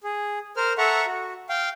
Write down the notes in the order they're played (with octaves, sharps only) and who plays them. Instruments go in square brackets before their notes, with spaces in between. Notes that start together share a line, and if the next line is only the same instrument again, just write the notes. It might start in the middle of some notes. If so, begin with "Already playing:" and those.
[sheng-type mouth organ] G#4
A#4 C5 F6
A4 E5 F#5 A#5 C#6
F#4
F5 G5